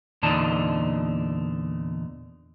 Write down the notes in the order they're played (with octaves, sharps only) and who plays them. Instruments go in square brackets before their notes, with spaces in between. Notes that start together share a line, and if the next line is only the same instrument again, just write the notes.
[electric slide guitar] E2 A#2 D3 D4 D#4 A5